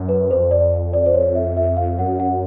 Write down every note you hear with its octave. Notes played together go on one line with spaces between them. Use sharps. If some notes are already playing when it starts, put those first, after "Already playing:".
Already playing: F#2
B4
F2 C5
D5
D5
C5
C#5
E5
E5
F5
F#2 F#5
F#5